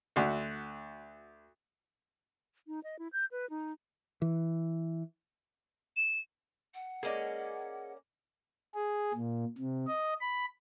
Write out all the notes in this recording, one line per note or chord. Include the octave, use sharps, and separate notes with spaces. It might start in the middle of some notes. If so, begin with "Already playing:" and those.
D2 F#4
D#4
D#5
E4
G6
B4
D#4
E3
E7
F#5
A#3 C#4 G#4 D5 D#5
G#4
A#2
C3
D#5
B5